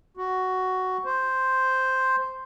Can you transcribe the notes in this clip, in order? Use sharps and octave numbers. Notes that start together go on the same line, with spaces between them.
F#4
C5